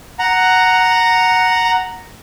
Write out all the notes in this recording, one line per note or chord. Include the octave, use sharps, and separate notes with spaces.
F#5 A#5